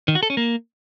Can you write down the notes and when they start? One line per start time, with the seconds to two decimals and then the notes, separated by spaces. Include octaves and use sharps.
0.08 D#3
0.15 F#4
0.23 A4
0.30 C#4
0.37 A#3